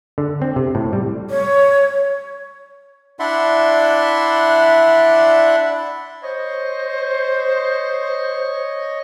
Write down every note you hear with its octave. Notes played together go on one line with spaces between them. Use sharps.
D3
C4
C3
A2
G3
C#5
D4 E4 D5 E5 F#5 C6
C5 C#5 D#5